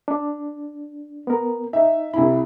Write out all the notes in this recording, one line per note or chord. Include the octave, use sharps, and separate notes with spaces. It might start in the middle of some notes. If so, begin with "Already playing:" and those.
D4
B3 A#4
D#4 E5
C2 E4 B5